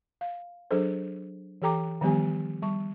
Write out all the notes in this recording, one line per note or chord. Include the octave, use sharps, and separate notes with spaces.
F5
F#3 D4 G#4 A4 C5
E3 G4 A4 G5 A#5 D6
D#3 F3 G3 B3 G4 G#5
G3 A5 C#6